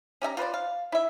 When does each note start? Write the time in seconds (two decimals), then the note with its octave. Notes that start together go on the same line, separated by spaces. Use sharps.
0.22 C#4 G4 E5 A#5
0.37 F4 B4 C5 D5
0.54 F5
0.92 E4 E5